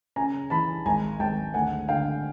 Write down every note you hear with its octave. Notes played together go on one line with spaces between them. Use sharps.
C#3 G#5 A#5
E3 A5 B5
G#1 G#5 A#5
G#1 G5 A5
D2 F#5 G#5
D3 F5 G5